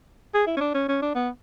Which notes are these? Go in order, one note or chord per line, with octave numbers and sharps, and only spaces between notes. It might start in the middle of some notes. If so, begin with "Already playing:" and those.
G#4
E4
C#4
D4
C#4
C#4
D4
B3